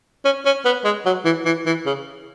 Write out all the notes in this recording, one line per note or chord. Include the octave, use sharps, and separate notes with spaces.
C#4
C#4
B3
G#3
F#3
E3
E3
E3
C#3